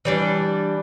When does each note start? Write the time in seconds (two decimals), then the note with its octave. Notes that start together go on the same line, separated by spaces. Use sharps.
0.05 E3 G3 D4